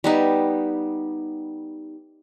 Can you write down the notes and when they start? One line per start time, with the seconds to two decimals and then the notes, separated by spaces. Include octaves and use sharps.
0.04 G3 B3 D#4